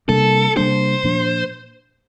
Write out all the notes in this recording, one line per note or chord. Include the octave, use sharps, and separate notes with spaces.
C3 G3 A#3 D4 A4
C3 G3 A#3 D4 C5
A#2 F3 A#3 D4